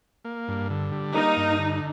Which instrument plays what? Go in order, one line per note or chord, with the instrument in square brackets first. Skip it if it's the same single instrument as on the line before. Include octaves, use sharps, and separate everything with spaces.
[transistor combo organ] A#3
G2
D3
G3
[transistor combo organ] A#3 [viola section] D#4
[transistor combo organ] G2
D3